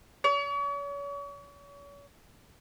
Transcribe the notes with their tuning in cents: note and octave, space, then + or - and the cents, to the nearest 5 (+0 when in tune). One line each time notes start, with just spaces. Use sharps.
C#5 +40